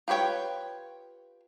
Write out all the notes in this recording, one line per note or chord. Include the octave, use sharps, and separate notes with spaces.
F4 G4 B4 C#5 G5